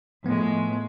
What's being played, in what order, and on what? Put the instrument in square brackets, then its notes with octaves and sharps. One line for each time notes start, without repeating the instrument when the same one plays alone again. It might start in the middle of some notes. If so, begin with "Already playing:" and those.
[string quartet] A2 G#3 [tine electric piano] F3 B3